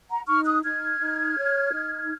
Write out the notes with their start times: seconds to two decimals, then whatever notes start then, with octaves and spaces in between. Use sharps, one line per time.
0.09 F#5 A#5
0.28 D#4 C#6 F6
0.45 D#6 F#6
0.63 D#4 F6 G#6
0.99 D#4
1.36 C#5
1.72 D#4